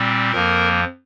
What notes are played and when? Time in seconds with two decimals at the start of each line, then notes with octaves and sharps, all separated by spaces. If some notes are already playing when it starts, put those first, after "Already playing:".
Already playing: A#2 G3 C4
0.32 F2 F3 A#3 A#4